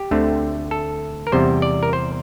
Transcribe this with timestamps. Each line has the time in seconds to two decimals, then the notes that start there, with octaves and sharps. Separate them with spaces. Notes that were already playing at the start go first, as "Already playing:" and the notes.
Already playing: G4
0.11 D2 D3 A3 C4
0.71 A4
1.27 A#4
1.32 E2 C3 G3 C5
1.62 D5
1.83 A#4
1.93 C5